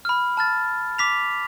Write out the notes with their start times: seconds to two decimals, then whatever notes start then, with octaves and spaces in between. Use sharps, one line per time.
0.05 B5 F6
0.37 A5 F6 A6
0.98 D6 B6 F7